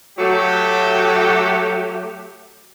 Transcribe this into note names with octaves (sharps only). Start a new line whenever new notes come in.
F#3 A3 G4